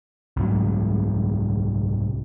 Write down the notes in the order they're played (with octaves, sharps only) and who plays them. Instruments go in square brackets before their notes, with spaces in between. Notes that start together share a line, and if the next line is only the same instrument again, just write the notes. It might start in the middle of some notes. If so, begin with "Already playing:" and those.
[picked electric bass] C2 G#2 F#3